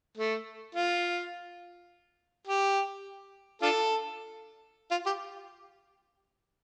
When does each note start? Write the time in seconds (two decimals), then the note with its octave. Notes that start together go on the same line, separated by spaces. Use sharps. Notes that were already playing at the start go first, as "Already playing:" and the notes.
0.17 A3
0.75 F4
2.47 G4
3.62 D4 F4 A4
4.91 F4
5.06 G4